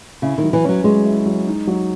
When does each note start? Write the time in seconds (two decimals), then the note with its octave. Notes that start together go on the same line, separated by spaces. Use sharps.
0.22 C#3 E4
0.38 D#3
0.43 F#3
0.53 E3
0.64 F#3 C#4
0.84 F#3 G#3
1.06 E4
1.26 F#3
1.47 D#4
1.67 F#3